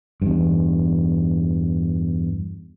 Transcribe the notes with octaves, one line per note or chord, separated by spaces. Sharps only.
E2 G2